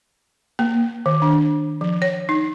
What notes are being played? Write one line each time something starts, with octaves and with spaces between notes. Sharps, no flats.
A#3
D#3
D4
F3
C#5
D#4